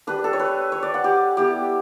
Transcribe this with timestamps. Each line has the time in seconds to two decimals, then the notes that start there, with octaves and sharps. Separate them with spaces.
0.07 G3 D4 B4
0.24 A4
0.33 C#5
0.39 B4
0.72 C#5
0.83 D5
0.94 F#5
1.04 G4
1.37 G3 B3 E4 G4